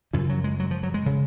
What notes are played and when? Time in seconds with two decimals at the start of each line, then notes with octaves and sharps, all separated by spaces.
0.13 F#2 C#3 F3
0.29 F#3
0.44 G#3
0.60 F#3
0.71 F3
0.83 F#3
0.94 G#3
1.06 C#3